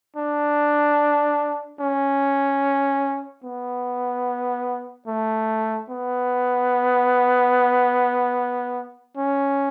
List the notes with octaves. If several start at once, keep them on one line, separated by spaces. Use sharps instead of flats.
D4
C#4
B3
A3
B3
C#4